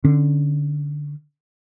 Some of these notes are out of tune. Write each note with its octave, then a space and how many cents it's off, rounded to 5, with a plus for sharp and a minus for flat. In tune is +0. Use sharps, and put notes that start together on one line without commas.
D3 +0 C#4 -10